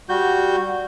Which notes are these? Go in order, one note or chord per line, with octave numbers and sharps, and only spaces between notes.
G3 F#4 G6